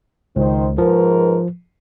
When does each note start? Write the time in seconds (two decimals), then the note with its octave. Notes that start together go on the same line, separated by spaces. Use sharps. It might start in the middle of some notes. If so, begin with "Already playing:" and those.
0.36 C#2 D#3 C5
0.78 G#2 F3 A#4 B4